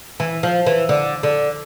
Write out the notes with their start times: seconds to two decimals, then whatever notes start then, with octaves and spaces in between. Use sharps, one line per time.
0.20 E3
0.43 F3
0.66 E3
0.89 D3
1.23 D3